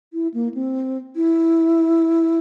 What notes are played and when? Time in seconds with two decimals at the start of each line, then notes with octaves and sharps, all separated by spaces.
0.13 E4
0.34 A#3
0.54 C4
1.16 E4